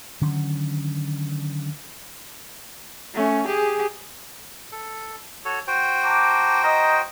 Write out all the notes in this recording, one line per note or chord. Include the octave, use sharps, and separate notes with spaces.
D3 D#3 F#3 C#4
A3 C#4
G4 G#4
A4
F#4 A4 C#5
F#4 C5 G5
A5 A#5 D6
D#5 A#5